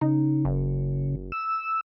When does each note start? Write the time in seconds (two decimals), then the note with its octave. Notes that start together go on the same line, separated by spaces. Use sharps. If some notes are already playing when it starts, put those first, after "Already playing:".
0.01 C#3 D#4
0.45 F#1
1.32 E6